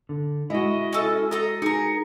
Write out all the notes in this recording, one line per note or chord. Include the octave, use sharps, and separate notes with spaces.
D3
G#3 E4 F#4 D#5
C#4 A4
A4 D#5 A#5
D#4 G#4 A#4 A#5 C#7